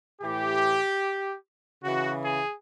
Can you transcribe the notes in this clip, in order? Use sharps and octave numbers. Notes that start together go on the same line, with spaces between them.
A2 E3 G4
C#3 E3 F#4
G#4